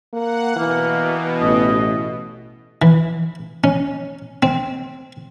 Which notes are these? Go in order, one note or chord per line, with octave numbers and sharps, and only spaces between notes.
A#3 F#5
B2 E3 A#3
A1 D#5
E3
C#4
C4